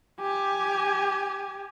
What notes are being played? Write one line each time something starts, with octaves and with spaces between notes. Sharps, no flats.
G4 G#5